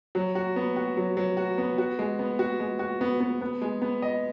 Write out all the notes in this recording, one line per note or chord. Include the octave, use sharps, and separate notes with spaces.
F#3
F#4
B3
F#4
F#3
F#3
F#4
B3
F#4
G#3
B3
F#4
G#3
F#4
B3
B3
B3
G#3
B3
D#5